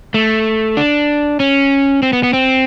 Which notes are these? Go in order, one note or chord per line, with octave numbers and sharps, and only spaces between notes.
A3
D4
C#4
C4
B3
B3
C4